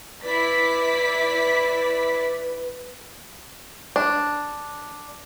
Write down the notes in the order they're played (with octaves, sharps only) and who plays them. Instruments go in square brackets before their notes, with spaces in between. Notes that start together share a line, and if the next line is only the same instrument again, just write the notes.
[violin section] E4 D5 B6 [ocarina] B4
[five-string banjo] D4